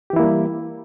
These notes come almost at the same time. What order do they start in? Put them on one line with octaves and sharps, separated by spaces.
G4 E3 E4 A#3 G3